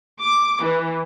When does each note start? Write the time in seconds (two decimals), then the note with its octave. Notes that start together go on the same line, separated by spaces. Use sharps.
0.21 D6
0.63 E3